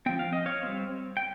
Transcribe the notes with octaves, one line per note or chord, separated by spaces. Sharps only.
F3 C4 G5
F5
D#5
C#5 F5
G3 C4
G5